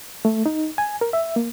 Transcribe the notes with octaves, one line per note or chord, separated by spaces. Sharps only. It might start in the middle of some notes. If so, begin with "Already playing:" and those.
A3
D#4
G#5
A#4
E5
A#3